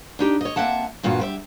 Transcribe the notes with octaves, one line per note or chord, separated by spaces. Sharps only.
D4 D#4 G4
C#5 D#5
A#3 C4 E5 F#5 A5
G2 A#2 E3 F4 F#4
G4 C5 E5